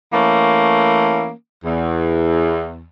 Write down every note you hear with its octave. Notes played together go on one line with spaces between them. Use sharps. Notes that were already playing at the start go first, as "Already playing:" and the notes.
E3 A3 A#3 C#4
E2